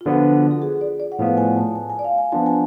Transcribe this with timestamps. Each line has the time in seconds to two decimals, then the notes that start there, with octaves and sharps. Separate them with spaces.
0.01 F4
0.05 D3 F3 B3 F#4
0.51 A4
0.62 G#4
0.81 D5
1.00 D5
1.12 F#5
1.19 A2 F3 B3 F5
1.37 G#5
1.56 A5
1.75 G#5
1.90 G#5
1.99 D5
2.04 F5
2.18 G#5
2.32 F3 B3 D4 F4 A5
2.46 G#5